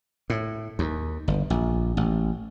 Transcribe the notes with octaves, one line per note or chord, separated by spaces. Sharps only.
A2
D#2
G1
A#1
A1